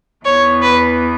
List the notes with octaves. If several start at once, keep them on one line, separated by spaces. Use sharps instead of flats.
E2 E3 B3 C#5
B4